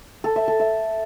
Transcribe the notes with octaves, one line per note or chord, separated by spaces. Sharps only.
A4
E5
A4
E5